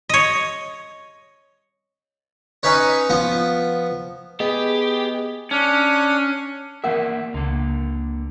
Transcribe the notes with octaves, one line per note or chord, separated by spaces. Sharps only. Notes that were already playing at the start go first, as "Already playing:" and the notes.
C#5 D#5
C#4 D#4 B4 C#5
F3 B3
B3 G4 G#4 D#5 G5
C#4 D4
E3 A#3 A#4 E5 F#5
C#2 D3 A#3